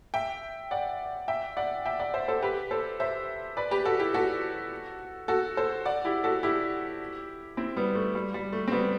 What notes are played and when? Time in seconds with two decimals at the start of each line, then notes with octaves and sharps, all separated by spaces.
0.14 E5 G5
0.71 D5 F#5
1.28 E5 G5
1.57 D5 F#5
1.86 E5 G5
1.99 D5 F#5
2.14 C5 E5
2.28 A4 C5
2.42 G4 B4
2.71 A4 C5
3.00 C5 E5
3.57 B4 D5
3.71 G4 B4
3.85 F#4 A4
4.00 E4 G4
4.14 F#4 A4
5.28 F#4 A4
5.57 A4 C5
5.85 D5 F#5
6.05 E4 G4
6.24 F#4 A4
6.43 E4 G4
7.57 C4 E4
7.77 G3 B3
7.95 A3
8.15 G3
8.34 G3
8.53 A3
8.68 C4
8.72 G3 B3